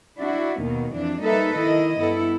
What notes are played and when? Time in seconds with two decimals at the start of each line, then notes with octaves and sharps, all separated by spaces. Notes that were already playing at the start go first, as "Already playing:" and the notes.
0.18 D4 E4 F#4
0.60 D#2 B2 D#3
0.93 F2 E3 D4
1.23 G3 A#3 D#4 A4 B4 E5
1.57 D#3 E4 D#5
1.98 G2 B3 E4 A4